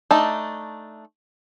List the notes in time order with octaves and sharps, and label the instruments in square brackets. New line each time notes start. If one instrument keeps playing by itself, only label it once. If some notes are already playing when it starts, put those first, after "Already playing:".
[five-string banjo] A3 D4 D#4